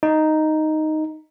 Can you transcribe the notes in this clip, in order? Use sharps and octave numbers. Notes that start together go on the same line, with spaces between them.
D#4